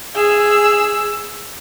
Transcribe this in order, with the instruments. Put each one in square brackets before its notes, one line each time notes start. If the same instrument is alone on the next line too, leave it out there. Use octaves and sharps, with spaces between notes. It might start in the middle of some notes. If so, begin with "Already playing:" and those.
[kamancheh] G#4 E6